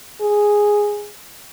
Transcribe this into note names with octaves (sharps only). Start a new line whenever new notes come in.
G#4